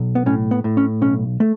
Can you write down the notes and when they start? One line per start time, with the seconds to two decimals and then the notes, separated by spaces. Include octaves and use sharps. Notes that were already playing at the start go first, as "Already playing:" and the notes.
Already playing: B1
0.15 B3
0.26 A2 C#4
0.51 B3
0.64 A2
0.77 C#4
1.01 B1 C#4
1.40 A3